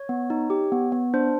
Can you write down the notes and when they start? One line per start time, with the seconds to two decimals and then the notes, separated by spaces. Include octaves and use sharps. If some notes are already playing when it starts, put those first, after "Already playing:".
Already playing: C#5
0.09 B3
0.30 D#4
0.50 G4
0.72 B3
0.92 B3
1.14 D4 C5